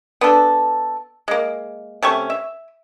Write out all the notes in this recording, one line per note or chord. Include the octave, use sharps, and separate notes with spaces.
B3 D4 A4
G#3 A#3
C3 A3 C#4 C#6
E5